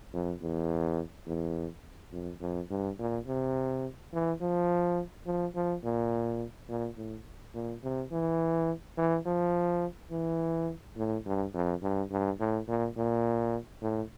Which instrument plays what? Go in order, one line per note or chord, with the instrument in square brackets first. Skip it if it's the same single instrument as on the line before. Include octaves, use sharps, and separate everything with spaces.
[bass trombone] F2
E2
E2
F2
F2
G2
A#2
C3
E3
F3
F3
F3
A#2
A#2
A2
A#2
C3
E3
E3
F3
E3
A2
G2
F2
G2
G2
A2
A#2
A#2
A2